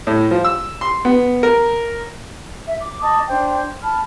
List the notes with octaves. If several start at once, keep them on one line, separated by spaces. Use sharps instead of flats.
A2
F3
E6
C6
B3
A#4
E5
D6
D#5 A5 D6 D#6
D4 C5 G5
A5 B5 F6